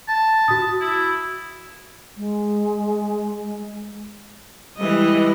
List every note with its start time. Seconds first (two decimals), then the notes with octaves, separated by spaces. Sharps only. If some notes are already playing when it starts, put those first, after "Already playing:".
0.08 A5
0.48 F#4 D#6
0.81 E4
2.17 G#3
4.78 E3 G3 G#3 E4 D#5